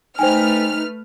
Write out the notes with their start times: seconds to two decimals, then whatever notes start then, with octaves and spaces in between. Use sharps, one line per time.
0.19 A3 D#4 B4 C5 G5 G#5 F6